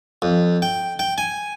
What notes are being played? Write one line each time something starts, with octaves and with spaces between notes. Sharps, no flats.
F2
G5
G5
G#5